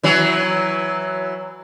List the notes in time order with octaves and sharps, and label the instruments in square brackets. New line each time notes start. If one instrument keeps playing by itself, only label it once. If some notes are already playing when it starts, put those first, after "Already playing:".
[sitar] E3 F#3